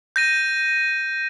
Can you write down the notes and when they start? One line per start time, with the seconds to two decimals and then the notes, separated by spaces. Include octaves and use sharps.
0.16 G6 A#6 D#7